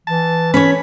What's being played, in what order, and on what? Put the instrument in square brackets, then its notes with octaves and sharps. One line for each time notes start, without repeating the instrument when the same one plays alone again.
[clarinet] E3 [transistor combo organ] A5
[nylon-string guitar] C#4 C#5 [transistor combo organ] B5